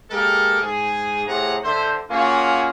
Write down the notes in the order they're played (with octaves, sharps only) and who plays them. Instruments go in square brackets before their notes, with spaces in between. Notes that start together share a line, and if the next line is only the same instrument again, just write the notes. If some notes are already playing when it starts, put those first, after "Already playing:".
[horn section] G#3 A#3 G4 A4 A#4
G#2 G#4
A2 C3 G#4 F#5 A#5
D3 C5 E5
A#3 C#4 F4 F#4 G#4 C#5